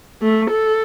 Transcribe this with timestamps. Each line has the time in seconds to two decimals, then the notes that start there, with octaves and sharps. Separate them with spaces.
0.22 A3
0.51 A4